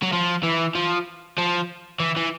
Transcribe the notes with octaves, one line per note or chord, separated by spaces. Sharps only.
F#3
F3
E3
F3
F3
E3
E3